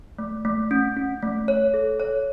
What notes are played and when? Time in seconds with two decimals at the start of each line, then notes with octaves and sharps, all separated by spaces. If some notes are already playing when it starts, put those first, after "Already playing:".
0.18 A3
0.45 A3
0.71 C#4
0.97 C#4
1.22 A3
1.48 C#5
1.74 A4
2.00 C#5